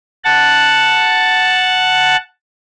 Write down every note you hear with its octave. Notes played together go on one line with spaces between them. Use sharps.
F#5 A5